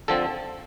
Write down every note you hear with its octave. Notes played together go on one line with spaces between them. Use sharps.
D3 F3 C4 A4